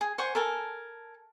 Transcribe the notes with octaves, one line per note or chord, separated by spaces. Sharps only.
G#4
C5 F#5 G#5 C#6
A4 A#4 G#5 A5